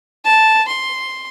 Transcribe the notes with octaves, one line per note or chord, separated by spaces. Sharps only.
A5
C6